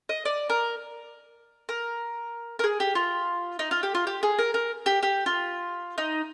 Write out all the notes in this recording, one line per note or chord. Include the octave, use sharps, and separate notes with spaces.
D#5
D5
A#4
A#4
A#4
G#4
G4
F4
D#4
F4
G4
F4
G4
G#4
A#4
A#4
G4
G4
F4
D#4